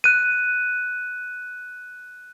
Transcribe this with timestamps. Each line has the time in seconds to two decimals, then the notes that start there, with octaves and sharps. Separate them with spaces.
0.04 F#6 D#7